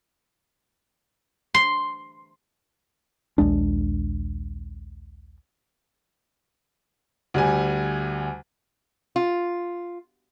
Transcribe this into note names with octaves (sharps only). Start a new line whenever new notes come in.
C6
A#1 D#2 G#3 D4
D2 G3 G#5
F4